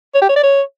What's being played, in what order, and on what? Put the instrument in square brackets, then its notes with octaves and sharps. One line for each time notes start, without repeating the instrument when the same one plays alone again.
[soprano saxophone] C#5
G4
C#5
D5
C#5